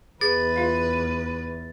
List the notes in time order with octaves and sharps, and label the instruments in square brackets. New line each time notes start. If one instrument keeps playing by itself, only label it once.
[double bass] E2 [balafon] G#4 [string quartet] B4 [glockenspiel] A6
[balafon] F4 F5